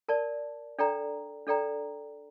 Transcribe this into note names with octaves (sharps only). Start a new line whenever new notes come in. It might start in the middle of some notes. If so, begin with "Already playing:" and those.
A#4 D5 A5
D4 A4 D5 G5 A#5
D4 A4 D5 G5 A#5